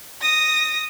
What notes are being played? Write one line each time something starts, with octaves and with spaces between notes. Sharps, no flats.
D#6 A#6